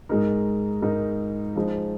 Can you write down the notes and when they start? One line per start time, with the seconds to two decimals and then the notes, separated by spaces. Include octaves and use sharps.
0.09 G#2 G#3 D#4 A#4
0.82 G#2 G#3 D#4 A#4
1.56 F3 G#3 D#4